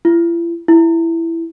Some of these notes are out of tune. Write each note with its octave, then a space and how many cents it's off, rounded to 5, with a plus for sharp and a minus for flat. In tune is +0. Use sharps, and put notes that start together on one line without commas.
E4 +45
E4 +10